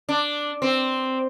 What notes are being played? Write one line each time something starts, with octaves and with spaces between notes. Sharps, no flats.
D4
C4